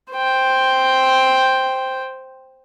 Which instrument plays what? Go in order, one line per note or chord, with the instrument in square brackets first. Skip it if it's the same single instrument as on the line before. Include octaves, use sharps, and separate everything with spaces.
[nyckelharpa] C5 G5